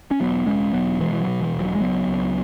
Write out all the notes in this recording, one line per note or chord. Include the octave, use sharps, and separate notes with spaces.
C#4
E1 F#3 B3
E1 G#3 C#4
E1 F#3 B3
B2 E3 G#3
E3
F#3
B2
E3
E1
F#3
G#3
C#2 F#3 B3
C#2